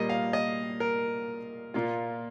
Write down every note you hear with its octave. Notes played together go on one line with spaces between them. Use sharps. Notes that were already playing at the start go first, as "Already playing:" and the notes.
Already playing: A#2 G3 A#3 D#5
F5
D#5
A#4
A#2 A#3 F4